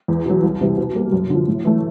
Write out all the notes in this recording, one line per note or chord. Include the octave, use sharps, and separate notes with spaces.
E2
B2 F#3
C2
C3 E3 G3
B2
G3 A#3
F#2
D3 F3
A2
E3 A3